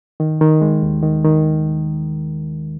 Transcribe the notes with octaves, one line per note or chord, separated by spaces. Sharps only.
D#3
D#3
G#3
D#2
D#3
D#3